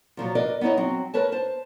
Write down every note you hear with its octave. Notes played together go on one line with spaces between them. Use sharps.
A#2 F3 F#3
A#4 B4 D5 D#5
B3 D#4 E4 C#5 D#5
F#3 C4
A#4 B4 C#5 A5
C5 A5